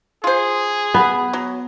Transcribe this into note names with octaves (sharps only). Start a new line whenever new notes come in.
F4 G#4 C5
B3
F#3